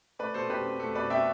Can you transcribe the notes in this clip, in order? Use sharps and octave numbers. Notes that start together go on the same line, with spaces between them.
A3 B4 D5
B2 A4 C5
B2 G4 B4
C4
A3 A4
B2 B4 D5
B2 E5 G5